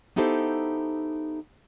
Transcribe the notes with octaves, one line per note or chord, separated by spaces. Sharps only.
B3 D#4 E4 G4 A4 C5